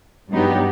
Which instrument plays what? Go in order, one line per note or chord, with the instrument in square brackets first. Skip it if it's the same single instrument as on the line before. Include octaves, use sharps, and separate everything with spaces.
[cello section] G2 F#3 B3 D#4 G4